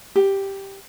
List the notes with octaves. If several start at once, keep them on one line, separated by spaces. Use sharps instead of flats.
G4